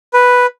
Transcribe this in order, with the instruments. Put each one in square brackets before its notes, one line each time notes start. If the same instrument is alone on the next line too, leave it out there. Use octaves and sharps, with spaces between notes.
[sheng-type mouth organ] B4